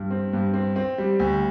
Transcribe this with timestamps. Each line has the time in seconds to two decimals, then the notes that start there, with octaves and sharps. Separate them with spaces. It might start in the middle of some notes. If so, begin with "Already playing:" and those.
Already playing: G2
0.11 C4
0.33 G2
0.54 C4
0.76 C4
0.98 G3
1.19 D2